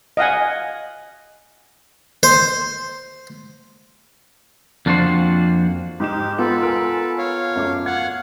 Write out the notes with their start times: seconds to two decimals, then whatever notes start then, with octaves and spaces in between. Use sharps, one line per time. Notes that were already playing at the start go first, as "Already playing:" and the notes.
0.17 D#5 F5 F#5 G#5
2.23 C5
4.86 F2 A#3 D4 F4 F#4 C5
6.00 G#2 D#4 G4 E7
6.39 B3 F4 A4 B4
6.63 A#4 G#5
7.18 C#5 F5
7.56 F#2 A3 D6
7.86 F5 F#5 G#6